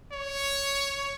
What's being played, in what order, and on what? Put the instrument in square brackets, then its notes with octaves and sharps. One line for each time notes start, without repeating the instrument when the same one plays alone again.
[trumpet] C#5